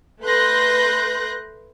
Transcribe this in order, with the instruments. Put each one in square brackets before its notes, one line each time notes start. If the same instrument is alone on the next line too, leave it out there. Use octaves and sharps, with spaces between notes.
[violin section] A3 B4 C6 F#6 G6 A#6